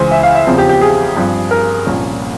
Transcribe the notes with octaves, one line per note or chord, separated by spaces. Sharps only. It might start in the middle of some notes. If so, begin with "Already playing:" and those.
Already playing: C#2 C#3 E3 C5 G#5
E5
F5
E5
E2 C#3 F3 C4
G4
G4
G#4
G2 F3 C4
A#4
C2 A#2 F3 A#3 C#4